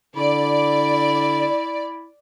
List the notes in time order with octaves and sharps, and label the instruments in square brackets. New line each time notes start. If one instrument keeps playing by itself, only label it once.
[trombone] D3 [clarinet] E4 [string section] D5